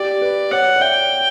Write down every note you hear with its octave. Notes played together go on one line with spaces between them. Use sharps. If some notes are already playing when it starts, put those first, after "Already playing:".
Already playing: G4 D5
B4
C#5 F#5
D5
E5 G5